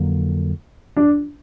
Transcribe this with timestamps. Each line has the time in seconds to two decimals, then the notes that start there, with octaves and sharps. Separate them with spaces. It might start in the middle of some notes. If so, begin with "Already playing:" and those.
Already playing: F2 D3 F#3 A#3
0.97 D4